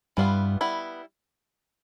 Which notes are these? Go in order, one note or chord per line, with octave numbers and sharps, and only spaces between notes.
G2 E3 G3 B3 D4 F4
G3 B3 E4